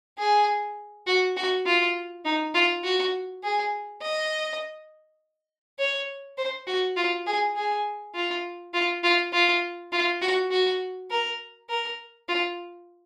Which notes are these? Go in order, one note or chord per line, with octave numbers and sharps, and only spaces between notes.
G#4
F#4
F#4
F4
D#4
F4
F#4
G#4
D#5
C#5
C5
F#4
F4
G#4
G#4
F4
F4
F4
F4
F4
F#4
F#4
A#4
A#4
F4